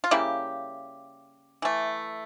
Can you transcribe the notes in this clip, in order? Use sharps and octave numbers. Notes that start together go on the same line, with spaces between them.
F4
C#3 G3 A#3 E4 G4
E3 A3